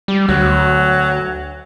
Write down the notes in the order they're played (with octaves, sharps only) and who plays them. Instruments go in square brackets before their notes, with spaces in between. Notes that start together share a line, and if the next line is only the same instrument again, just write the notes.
[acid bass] G3
[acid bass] D2 [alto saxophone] F#3